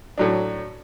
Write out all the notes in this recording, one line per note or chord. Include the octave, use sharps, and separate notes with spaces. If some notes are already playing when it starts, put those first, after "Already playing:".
A2 F#3 D4